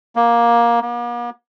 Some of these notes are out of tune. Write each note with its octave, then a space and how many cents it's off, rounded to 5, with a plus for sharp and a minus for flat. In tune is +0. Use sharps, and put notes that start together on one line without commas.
A#3 +15
A#3 +45